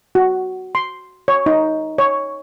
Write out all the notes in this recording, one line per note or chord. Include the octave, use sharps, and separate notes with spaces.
F#4
C6
C#5
D#4
C#5